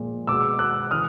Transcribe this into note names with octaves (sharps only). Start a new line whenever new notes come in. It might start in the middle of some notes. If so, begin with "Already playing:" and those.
Already playing: A#2 F3 G#3
B2 G#3 D6 E6
E6 F#6
C#3 E3 D#6 F6